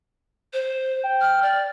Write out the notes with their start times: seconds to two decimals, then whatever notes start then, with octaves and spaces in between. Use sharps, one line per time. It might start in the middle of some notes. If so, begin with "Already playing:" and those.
0.53 C5
1.04 G5
1.21 F6
1.42 D5